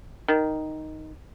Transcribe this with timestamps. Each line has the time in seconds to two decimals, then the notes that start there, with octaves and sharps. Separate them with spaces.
0.28 D#3